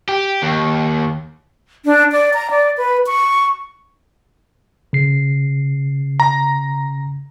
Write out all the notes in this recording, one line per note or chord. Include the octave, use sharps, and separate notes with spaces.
G4
D#2
D4
D5
A#5
D5
B4
C#6
C#3 C7
A#5